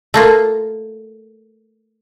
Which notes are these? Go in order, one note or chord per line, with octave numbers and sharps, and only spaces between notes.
A3 A#3 F4